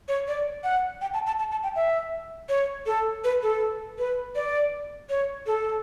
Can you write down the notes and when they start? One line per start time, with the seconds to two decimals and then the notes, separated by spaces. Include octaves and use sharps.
0.08 C#5
0.28 D5
0.64 F#5
1.01 G5
1.14 A5
1.27 A5
1.39 A5
1.51 A5
1.63 G5
1.76 E5
2.49 C#5
2.86 A4
3.24 B4
3.43 A4
3.98 B4
4.36 D5
5.10 C#5
5.47 A4